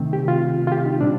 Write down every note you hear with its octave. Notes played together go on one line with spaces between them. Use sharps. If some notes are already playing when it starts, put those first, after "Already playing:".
Already playing: C3 D#3 A3 C4
G4
F4
F4
G4
D#4
A#2 G3 C4 D4